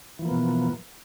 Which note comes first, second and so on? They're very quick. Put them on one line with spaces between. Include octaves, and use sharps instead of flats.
E3 F3 A#3 B3 B2